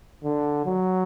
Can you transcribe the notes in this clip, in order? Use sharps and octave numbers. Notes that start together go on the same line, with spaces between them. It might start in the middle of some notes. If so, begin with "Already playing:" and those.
D3
F#3